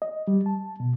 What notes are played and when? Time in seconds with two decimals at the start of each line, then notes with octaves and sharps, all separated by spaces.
0.02 D#5
0.28 G3
0.46 A5
0.80 B2